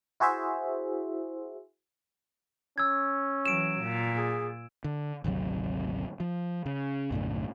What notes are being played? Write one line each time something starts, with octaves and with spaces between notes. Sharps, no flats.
E4 F#4 G#4 C5 E5
C#4 E6 G#6
E3 F#3 D7 E7
A#2
G#4
D3
G#1 D2 C3 F#3
F3
C#3
B1 F#2 A2 D3